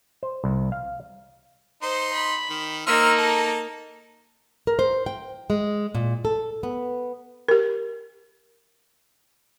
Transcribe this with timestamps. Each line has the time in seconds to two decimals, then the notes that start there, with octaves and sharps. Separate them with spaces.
0.23 C5
0.44 C2
0.72 F5
1.82 D#4 C5 C6
2.14 B5
2.50 D#3
2.87 A#3 D#4 C5 E6 F6
3.17 A4
4.67 A#4
4.79 C5
5.06 G5
5.50 G#3
5.95 A#2
6.25 A4
6.63 B3
7.48 G4 A#4